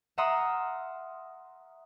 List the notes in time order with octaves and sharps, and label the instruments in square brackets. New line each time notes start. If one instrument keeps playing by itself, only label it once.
[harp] E5 F#5 A#5 C6 D#6 F6